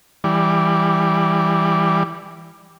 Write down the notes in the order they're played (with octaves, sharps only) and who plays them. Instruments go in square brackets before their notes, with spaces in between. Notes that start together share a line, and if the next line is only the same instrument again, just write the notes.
[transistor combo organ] E3 G3 D5